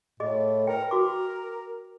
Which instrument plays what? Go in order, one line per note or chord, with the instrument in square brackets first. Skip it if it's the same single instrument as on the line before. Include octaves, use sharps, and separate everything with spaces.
[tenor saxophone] A2 [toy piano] G#4 D#5
[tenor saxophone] A#4 [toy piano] B4 G5
[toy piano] F#4 D6 [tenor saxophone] A#4